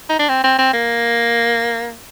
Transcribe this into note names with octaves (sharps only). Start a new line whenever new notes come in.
D#4
D4
C4
C4
C4
A#3